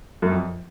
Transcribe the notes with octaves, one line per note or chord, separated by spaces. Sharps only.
F#2
F2